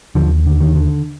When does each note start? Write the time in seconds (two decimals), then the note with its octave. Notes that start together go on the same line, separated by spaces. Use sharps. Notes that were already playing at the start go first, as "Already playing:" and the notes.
0.15 D#2 D3 F3
0.46 D3
0.61 D#3
0.75 D3